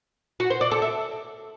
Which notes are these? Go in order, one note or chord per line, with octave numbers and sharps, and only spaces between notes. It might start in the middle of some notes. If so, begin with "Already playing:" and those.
F#4
C5
D5
A4
E5